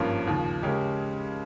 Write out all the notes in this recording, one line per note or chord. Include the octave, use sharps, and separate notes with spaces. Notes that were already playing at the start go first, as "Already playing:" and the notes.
Already playing: G#1 G2 F3 A#3 C#4
D#2 C#3 F3
C#3 G#3 C#4 G4 A#4